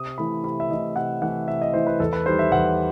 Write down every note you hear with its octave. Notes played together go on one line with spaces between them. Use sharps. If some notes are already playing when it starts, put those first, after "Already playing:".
Already playing: C3 D#6
E3 A3 E4 B5
C3 B5
E5
E3 A3 E4 D#5
C3 F#5
E3 A3 E4 F#5
C3 E5
D#5
E3 A3 E4 C5
B4
E2 A4
B4
D#3 G3 C5
E5
E2 F#5